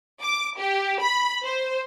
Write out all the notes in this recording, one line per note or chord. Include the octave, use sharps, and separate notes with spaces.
D6
G4
B5
C5